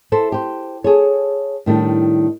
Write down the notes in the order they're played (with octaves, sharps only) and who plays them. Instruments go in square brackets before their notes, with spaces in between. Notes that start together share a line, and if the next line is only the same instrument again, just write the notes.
[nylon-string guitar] E4 A4 C5
G4 C5
G#4 A4 C#5
A2 D#3 G3 D4